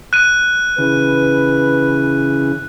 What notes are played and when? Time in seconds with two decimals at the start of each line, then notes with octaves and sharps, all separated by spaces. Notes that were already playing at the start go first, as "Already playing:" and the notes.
0.13 F#6 D#7
0.78 C#3 E3 B4